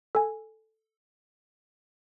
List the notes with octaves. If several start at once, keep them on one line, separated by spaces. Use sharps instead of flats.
A4 G#5